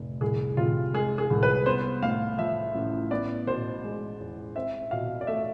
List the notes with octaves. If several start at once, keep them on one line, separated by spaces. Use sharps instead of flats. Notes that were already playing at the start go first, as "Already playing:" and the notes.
Already playing: F1
C2 G#4
C3 F4
G#3 G#4
G#4
C2
B4
B3 C5
A2 F5
F3 E5
A1
B3 D5
B2 C5
G#3
E2
C4 E5
B2 F5
D5
A3 E5